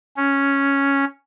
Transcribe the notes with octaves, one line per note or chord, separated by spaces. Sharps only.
C#4